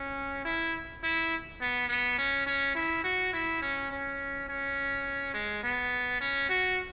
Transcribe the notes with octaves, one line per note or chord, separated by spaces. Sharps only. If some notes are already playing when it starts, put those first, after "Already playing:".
Already playing: C#4
E4
E4
B3
B3
C#4
C#4
E4
F#4
E4
C#4
C#4
C#4
G#3
B3
C#4
F#4